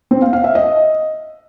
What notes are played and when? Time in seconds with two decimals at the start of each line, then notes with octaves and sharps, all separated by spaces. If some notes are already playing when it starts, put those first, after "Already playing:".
0.11 C4
0.22 F5
0.33 F5
0.44 E5
0.55 D#5